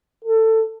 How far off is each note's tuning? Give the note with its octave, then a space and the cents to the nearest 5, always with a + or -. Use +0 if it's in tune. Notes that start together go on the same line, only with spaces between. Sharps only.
A4 +20